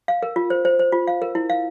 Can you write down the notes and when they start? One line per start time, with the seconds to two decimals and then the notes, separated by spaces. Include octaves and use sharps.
0.08 F5
0.23 A#4
0.36 F4
0.50 C5
0.65 C5
0.79 C5
0.92 F4
1.07 F5
1.22 A#4
1.35 E4
1.50 F5